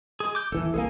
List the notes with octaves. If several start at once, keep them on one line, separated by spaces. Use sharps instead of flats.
G#3 G#4
D6 G6
D#1 E3 A4
C2 G#3 A#3 G#4 A4 G#5